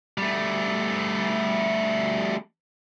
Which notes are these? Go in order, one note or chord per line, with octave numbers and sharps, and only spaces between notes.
G3 A3